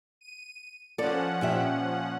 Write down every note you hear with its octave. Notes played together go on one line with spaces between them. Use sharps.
D#7
F3 C#4 A4 D5 F#5
A#2 G4 E5